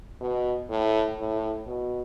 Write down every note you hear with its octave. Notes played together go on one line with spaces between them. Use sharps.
B2
A2
A2
B2